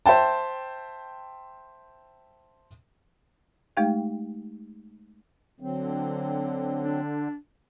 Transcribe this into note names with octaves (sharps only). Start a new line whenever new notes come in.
C5 E5 G5 A5
G#3 A3 D#4 G4 F5 G5
D3 F#3 C4
D4